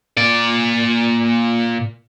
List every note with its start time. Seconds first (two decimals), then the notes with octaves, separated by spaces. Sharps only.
0.17 A#2 D5